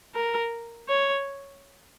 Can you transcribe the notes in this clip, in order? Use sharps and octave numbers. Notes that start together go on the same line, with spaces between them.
A#4
C#5